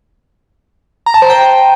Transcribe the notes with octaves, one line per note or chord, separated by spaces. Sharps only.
A#5
A5
C5
G5